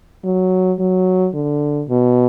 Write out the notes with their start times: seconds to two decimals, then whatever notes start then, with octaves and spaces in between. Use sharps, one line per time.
0.24 F#3
0.79 F#3
1.34 D3
1.89 B2